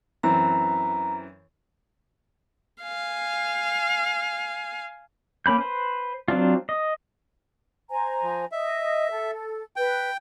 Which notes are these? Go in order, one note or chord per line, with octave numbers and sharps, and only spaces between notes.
F#2 E3 C4 A#5
F5 G#5
A#3 C#4 B5 G6
B4 C5
F#3 C4 D4 F4
D#5
C5 G#5 A#5
F3
D#5 E5
A4
B4 G5